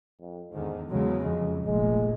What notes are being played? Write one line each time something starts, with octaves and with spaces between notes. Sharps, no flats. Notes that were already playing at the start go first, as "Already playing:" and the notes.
F2
E2 G#2 D3 D#3
E2 C#3 F#3 G#3
F2 G#3
F1 A#1 A#2 G#3